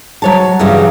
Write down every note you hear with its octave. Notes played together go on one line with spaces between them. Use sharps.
F#3 C#5 A5
G2 C#3 E3 F#3 G3